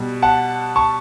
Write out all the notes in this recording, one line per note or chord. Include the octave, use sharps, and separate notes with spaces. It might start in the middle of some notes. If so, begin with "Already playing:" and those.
Already playing: B2 G3
F#5 A5
A5 C#6